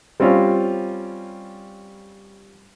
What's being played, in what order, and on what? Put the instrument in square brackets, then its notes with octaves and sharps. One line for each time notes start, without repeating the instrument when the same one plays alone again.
[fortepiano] G3 C4 C#4 F4